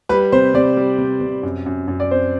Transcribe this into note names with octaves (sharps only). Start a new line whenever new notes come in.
G3 B4
C3 C5
C3 D5
G3
C3
C3
F#2
F#2
F#2
D5
C4 C5